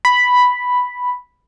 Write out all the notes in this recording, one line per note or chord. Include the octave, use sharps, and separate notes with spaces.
B5